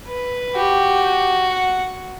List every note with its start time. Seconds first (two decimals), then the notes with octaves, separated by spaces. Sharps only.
0.08 B4
0.54 F#4 G4
1.48 F#5